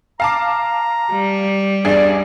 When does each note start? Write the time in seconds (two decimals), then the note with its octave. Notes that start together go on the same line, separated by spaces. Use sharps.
0.20 F5 A5 A#5 D6
1.12 G3
1.85 A1 E2 D4 G#4 D5